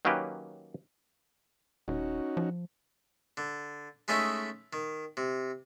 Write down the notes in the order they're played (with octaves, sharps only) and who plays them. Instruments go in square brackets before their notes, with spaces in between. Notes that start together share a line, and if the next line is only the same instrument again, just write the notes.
[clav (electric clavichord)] D#3 F#3 A#3 C#4 G4 B4
[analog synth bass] D#1 [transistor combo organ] C#4 D#4 F#4
[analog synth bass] F3
[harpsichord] D3
G#3 A3 C#4 D#4 E4
D#3
C3